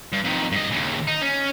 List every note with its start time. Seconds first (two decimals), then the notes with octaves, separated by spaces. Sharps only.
0.12 G2
0.24 F2 D#3
0.52 G2 D#5
0.71 D#2 C#3
1.07 D#4
1.21 C#4